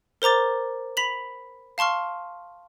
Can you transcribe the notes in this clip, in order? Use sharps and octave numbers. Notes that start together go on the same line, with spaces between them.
A#4 C5 A#5 D6 A6
B5 B6 F7 F#7
F5 A5 C6 C#6 F6